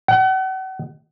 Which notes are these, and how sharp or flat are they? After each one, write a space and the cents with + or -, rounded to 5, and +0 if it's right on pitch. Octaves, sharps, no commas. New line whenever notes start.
F#5 +40